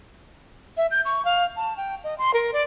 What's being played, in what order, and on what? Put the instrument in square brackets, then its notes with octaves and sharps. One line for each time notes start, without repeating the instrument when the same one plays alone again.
[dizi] E5
G6
C#6
F5
A5
G5
D#5
C6
A#4
D5